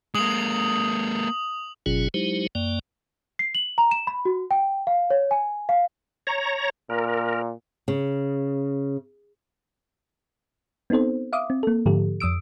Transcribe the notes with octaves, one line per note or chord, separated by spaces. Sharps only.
G#3 A#3 D#6 F#7
G1 B2 F#3 C#4 F4 G#4
F#3 G#3 D#4 E4 G4 C5
F#2 A#3 D5 G5
C7
F#7
A#5
E7
B5
F#4
G5
F5
C#5
G#5
F5
C#5 A#5
A#2 A#4
C#3
B3 C4 D#4 A4 C5
E5 F5 D6 D#6
C4
A#3 A4
G#2 D3 F3 G4 A4
F2 D#6 E6 D7